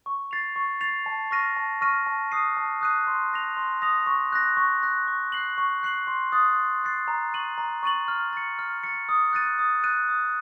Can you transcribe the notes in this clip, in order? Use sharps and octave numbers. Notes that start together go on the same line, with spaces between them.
C#6
A6 C7 F7
C#6
A6 C7 F7
A5
C#6 F6 A#6 D#7
A5
C#6 F6 A#6 D#7
A5
D#6 F#6 C7 D#7
A5
D#6 F#6 C7 D#7
C6
D#6 A#6 F7
C6
D#6 A#6 F7
C#6
F#6 A#6
C#6
F#6 A#6
C#6
F#6 C7 F#7
C#6
F#6 C7 F#7
C6
D#6 F#6 A6 C7
C6
D#6 F#6 A6 C7
A#5
C#6 A6 D#7 F#7
A#5
C#6 A6 D#7 F#7
F6
A6 C#7
F6
A6 C#7
D#6
F#6 A6 D#7
D#6
F#6 A6 D#7
D#6